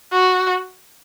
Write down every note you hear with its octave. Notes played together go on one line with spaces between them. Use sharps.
F#4